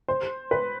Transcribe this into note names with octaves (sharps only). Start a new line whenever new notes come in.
C5
B4